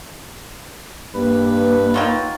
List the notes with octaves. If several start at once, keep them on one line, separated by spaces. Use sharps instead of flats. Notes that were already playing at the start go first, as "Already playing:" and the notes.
G2 A#3 B4
D#3 F#3 F4